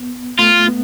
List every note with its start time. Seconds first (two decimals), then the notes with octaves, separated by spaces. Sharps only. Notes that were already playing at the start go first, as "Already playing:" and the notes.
Already playing: B3
0.39 A3 F4
0.68 B3